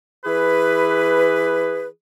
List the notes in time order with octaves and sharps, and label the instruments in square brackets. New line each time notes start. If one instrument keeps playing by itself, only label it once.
[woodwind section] E3 G#4 B4